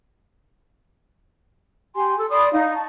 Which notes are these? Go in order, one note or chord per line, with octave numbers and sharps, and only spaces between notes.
G4 G#5 C6
A4 E6
D5 B5 C6 D#6
D#4 F5
A5 C#6